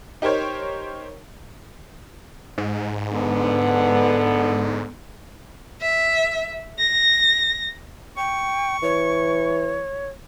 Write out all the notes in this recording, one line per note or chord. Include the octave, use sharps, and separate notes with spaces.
D#4 G4 A#4 C5 C#5
G#2
D3 B3
E5
A#6
G5 C#6
E3 C#5